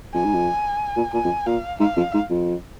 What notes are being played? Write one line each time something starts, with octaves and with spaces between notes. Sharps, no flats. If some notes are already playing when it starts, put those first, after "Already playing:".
F2 G#5
G#2
F2
A#2
A#2 G#5
F2
A#2 F5
G#2 F5
F2
G#2
F2